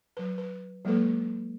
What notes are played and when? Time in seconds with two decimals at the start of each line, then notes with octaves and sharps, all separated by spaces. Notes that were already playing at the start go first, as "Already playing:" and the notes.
0.17 F#3 B4
0.38 B4
0.85 F#3 G#3 A#3 A4 B4